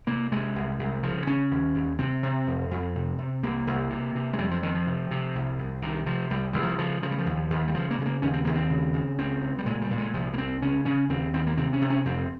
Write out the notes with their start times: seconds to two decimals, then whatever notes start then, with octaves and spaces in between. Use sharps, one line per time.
0.07 C3 A#3
0.32 C3 G#3
0.56 C2
0.79 C2
1.03 C#3 F3
1.27 C#3 C#4
1.51 D#2
1.75 D#2
1.99 C3 C4
2.23 C3
2.47 F2
2.71 F2
2.95 C3
3.19 C3
3.43 C2 A#3
3.67 C2
3.90 C3
4.15 C3
4.33 G#3
4.38 F2 G3
4.51 F3
4.62 F2 D#3
4.74 F3
4.87 C3
5.11 C3
5.35 C2
5.59 C2
5.82 C3 D#3
6.06 C3 F3
6.30 C2 G3
6.53 C2 G3
6.62 F3
6.78 C#3 F3
7.02 C#3 F3
7.11 G3
7.18 F3
7.26 D#2
7.50 D#2
7.68 G3
7.74 C#3 F3
7.91 A#3
7.98 C#3 G#3
8.06 A#3
8.22 D#2 C#4
8.33 C4
8.44 D#2 A#3
8.55 C4
8.70 C#3
8.94 C#3
9.18 C#2 C4
9.42 C#2
9.58 G3
9.66 A#2 G#3
9.82 G3
9.90 A#2
9.98 G#3
10.13 C2 F3
10.33 A#3
10.38 C2 C4
10.62 C#3 C#4
10.85 C#3 C#4
11.09 D#2 C4
11.34 D#2 C4
11.47 A#3
11.57 C3 C4
11.73 C#4
11.81 C3
11.90 C#4
12.05 F2 C4